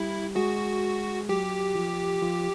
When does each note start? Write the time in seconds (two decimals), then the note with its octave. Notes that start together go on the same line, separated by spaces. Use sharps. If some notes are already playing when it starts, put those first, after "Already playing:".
Already playing: G3 E4 G4
0.35 G#3 F#4 G#4
1.29 F#3 F#4 G4
1.75 F3 F4
2.22 F3 F4